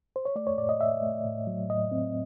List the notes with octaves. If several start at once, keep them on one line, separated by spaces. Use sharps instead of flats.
C5
C#5
A3 D5
C#5
A2 D5
D#5
A2 E5
A3
A2
F#3
A2 D#5
C4